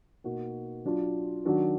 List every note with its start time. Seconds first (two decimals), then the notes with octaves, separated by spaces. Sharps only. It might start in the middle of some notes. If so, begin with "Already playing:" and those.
0.24 B2 A#3 D#4 F#4
0.85 F#3 D4 F4
1.45 D#3 F#3 D4 F#4